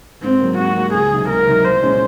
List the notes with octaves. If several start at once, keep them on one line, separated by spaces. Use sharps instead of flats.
G#2 C4
F#3 A#3
G#2 F#4
F#3 A#3
C#2 G#4
C3 D#3 F#3
C#2 A#4
C3 D#3 F#3
C2 C5
A#2 G#3 C#4